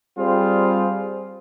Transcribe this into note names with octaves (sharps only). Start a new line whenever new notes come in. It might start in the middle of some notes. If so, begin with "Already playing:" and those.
G3 C4 F4 G#4 C5